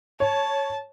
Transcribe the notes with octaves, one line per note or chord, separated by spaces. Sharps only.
C#5 A5